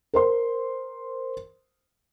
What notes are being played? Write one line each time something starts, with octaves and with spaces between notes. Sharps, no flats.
A#4 C5 C6